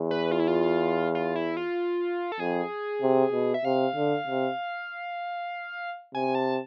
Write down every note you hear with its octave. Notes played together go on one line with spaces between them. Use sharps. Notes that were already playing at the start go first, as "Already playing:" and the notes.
Already playing: E2
B4
F4
E4
F4
F4
E4
F4
A4
F2 G#4
C3
B2
E5
C3 F5
D3
C3
C3 G#5
A5